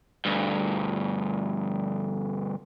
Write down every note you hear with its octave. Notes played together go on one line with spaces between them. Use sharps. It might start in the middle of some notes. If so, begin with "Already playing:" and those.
D2 G2